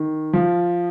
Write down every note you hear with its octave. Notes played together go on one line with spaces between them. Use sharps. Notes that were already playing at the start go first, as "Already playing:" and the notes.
Already playing: D#3
F3